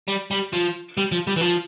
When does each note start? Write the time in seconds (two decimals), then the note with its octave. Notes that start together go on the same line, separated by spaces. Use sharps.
0.08 G3
0.31 G3
0.53 F3
0.97 G3
1.12 F3
1.27 G3
1.36 E3
1.41 F3